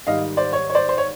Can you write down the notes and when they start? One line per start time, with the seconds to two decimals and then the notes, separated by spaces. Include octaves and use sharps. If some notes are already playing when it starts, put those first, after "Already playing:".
0.07 G#2 D#3 G3 D#5 F5
0.37 C5 D5
0.53 C#5
0.70 C#5
0.75 C5 D5
0.89 C5
0.98 C#5